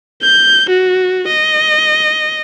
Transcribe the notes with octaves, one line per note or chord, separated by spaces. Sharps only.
G6
F#4
D#5